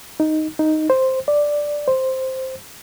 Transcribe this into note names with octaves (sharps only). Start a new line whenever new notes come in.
D#4
D#4
C5
D5
C5